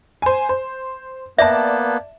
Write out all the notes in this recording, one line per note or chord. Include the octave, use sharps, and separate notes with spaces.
C5 G#5
C5
A#3 B3 D5 E5 A5